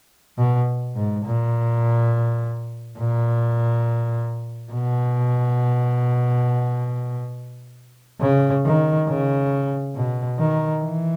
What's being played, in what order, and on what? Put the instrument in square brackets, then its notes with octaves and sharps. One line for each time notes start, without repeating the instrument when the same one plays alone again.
[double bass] B2
G#2
A#2
A#2
B2
C#3
D#3
C#3
B2
D#3
E3